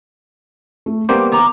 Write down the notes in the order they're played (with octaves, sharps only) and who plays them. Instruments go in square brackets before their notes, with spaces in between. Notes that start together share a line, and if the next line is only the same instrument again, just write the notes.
[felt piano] A3
[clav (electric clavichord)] G3 A#3 C5 [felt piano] B3 [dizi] D6
[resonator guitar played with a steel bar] D#3 A#5 [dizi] D6